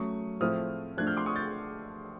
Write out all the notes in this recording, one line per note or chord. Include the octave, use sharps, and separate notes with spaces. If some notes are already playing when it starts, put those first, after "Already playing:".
Already playing: F#3 A3 C#4 C#6 D#6
A2 F3 A3 C4 E4 D#6 F6
F3 A3 D4 F#6 G#6
F6 G6
C6 D6
C#6 D#6
G6 A6